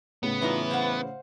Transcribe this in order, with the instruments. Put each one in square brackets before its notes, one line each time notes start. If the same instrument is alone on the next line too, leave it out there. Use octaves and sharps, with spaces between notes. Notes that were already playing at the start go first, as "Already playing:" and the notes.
[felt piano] A2 C#3 [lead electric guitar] B3
[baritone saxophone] E3 [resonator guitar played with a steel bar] D4 D#4 F4
[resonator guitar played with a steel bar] C5 F5 F#5